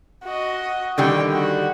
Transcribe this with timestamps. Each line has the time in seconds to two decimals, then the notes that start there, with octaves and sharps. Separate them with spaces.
0.23 F#4 D#5
0.98 D3 D#3 G3 G5
1.32 F#4